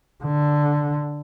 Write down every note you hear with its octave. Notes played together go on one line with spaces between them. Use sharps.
D3